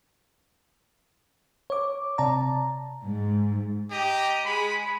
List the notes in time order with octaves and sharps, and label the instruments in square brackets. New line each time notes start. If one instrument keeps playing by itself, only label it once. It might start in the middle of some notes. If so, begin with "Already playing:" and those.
[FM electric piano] C#5 D6
C3 D5 A5 A#5
[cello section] G#2
[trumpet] G4 [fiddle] D#5 A#5
[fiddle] G#3 G#4 [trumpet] B5